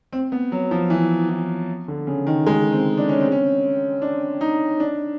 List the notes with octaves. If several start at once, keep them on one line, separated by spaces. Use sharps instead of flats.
C4
B3
F#3
F3
E3
E3
D3
C#3
D#3
G#3
C4
D4
C#4
C4
C#4
D4
D#4
D4